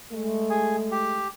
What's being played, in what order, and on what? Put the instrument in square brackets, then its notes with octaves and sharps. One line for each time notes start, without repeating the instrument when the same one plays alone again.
[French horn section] G#3 A3
[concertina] G#4
G4